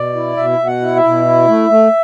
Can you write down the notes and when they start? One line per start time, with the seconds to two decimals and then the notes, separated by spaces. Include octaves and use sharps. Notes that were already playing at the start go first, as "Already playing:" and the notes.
Already playing: B2 D5
0.15 E4
0.36 B2 E5
0.59 B2
0.67 F#5
0.81 E4
0.96 E5
1.04 B2
1.25 E4
1.48 A3
1.70 A3